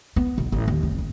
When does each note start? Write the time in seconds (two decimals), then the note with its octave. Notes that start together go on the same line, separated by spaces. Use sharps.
0.16 B3
0.38 B1
0.52 A1
0.68 D#2
0.83 F1
0.98 A1